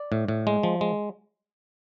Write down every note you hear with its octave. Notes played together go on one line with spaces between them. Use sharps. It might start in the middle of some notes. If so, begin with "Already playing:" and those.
Already playing: D5
A2
A2
G#3
F3
G#3